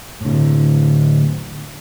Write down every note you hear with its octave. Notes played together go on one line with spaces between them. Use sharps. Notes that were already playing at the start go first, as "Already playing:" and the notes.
A2 D3